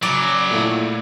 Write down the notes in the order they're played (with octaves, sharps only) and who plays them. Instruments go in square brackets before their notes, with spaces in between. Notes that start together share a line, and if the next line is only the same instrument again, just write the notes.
[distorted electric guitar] C#3 F#3 [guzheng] D5
[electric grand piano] A#2 A3 E4